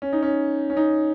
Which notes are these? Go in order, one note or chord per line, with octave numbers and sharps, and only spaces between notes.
C#4
D#4
C#4
C#4
D#4